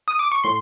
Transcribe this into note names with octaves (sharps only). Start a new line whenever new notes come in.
D#6
D6
C#6
A2 C6